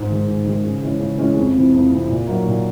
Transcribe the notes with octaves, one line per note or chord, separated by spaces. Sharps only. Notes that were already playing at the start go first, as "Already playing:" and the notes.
Already playing: G#2
D#3 G#3
G#2
D#3 G#3
C#3
E3 G#3 C#4
C#3
E3 G#3 C#4
F2
C3 E3
F2
C3 E3
A#2
F#3 A#3 D#4
A#2